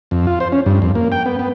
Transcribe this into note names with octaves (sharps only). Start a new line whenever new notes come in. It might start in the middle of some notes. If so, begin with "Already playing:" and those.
F2
F4
C5
C#4
G2
F2
A#3
G5
B3
B3